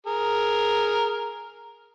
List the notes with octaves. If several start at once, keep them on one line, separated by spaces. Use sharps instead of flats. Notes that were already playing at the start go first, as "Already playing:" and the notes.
G#4 A#4